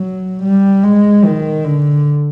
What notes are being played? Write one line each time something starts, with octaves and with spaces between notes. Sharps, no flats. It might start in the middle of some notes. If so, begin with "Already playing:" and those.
Already playing: F#3
G3
G#3
D#3
D3